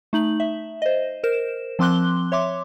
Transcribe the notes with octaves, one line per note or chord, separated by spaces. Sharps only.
A3 D#4 F#7
E5
C5 D#5
A#4 C5 E7
F3 C4 C6 D6 F#6 G7
C#5 E5 C6 D6